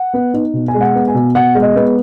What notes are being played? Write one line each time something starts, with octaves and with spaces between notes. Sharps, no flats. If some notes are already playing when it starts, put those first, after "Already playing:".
Already playing: F#5
B3
D#4
B2
G#5
G#3
F#5
B3
G#5
B2
B2 F#5
G#3
D#5
B3